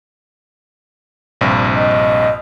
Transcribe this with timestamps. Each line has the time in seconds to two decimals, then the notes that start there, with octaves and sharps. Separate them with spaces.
1.41 A#1 G2 C3
1.75 D#5